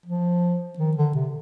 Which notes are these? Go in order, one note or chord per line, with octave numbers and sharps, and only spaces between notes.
F3
D#3
D3
C3